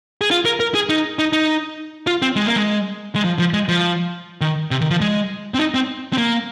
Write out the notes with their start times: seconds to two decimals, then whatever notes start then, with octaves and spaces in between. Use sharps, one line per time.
0.21 G#4
0.31 F4
0.45 A#4
0.60 A#4
0.75 G#4
0.89 D#4
1.19 D#4
1.33 D#4
2.07 F4
2.22 C4
2.36 G#3
2.46 A#3
2.56 G#3
3.15 G#3
3.24 F3
3.39 F3
3.53 G#3
3.69 F3
4.41 D#3
4.71 C3
4.81 D#3
4.91 F3
5.01 G#3
5.54 C4
5.59 D#4
5.74 C4
6.13 C4
6.18 A#3